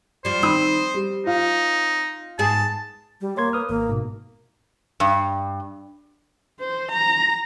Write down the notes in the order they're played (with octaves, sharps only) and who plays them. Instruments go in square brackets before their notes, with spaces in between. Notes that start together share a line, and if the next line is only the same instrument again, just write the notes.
[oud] F3 G3 [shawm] C5
[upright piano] D#3 B5 D#6 [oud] C4
[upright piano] G3
[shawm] D#4 [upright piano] F4 F5
[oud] G#2 B3 G#4 [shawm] A5
[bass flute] G3
[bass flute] A#3 [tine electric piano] C#5 C6 G#6
[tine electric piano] B4 D#6 F6
[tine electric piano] G#1 [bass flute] A#3
[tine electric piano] G#2 B2
[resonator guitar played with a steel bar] G2
[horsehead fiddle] C5
A#5